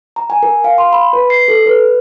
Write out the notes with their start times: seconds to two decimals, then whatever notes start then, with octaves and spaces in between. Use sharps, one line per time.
0.16 A#5
0.30 G#5
0.43 A#4
0.64 F5
0.78 C6
0.93 B5
1.13 B4
1.30 C7
1.48 A4
1.66 B4